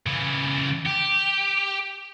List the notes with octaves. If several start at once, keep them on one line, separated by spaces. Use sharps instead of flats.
C#3 E3
G4